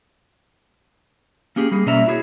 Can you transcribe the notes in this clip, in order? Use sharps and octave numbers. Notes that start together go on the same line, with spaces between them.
A#3 C#4 G4 G#4
G3 A#3 G#4
B2 A#3 C#4 D5 E5 A#5
E4 F#4 G#4 C#5